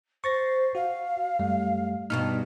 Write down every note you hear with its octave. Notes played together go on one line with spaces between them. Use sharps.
C5 C#6 A6 A#6
F#4 F5
F#2 G3 A3
G2 B2 D#4 F6